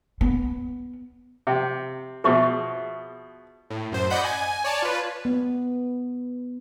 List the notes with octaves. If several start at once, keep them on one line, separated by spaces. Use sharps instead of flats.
B3
C3
B2 F3 G#4 E5 C#6
A2
F#2 C5
D5 D#5 F#5 B5 G6
G#5
C#5 D5 A5
F4 B4
B3